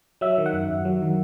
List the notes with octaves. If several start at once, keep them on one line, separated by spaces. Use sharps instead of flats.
F#3 E5
D#3
F#5
F#2
F#2
F#3
D#3